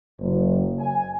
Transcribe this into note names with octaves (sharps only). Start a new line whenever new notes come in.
F#1
G#5